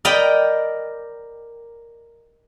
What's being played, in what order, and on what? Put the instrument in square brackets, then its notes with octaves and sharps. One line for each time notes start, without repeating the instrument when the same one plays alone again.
[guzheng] A#4 D5 D#5 G5 A#5 B5